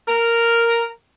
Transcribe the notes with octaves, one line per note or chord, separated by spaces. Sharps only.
A#4